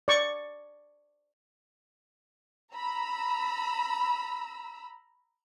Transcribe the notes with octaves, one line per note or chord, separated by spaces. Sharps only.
D5 C#6
A#5 B5 E6